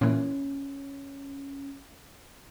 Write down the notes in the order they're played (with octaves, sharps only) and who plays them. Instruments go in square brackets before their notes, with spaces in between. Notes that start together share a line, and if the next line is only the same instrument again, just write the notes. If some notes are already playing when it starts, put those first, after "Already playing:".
[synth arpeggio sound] A#2 E3 [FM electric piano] C#4